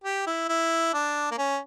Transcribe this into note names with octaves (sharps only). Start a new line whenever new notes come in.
G4
E4
E4
D4
A#3
C#4